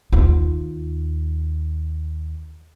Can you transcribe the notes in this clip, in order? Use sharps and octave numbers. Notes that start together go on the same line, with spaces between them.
D#2 F4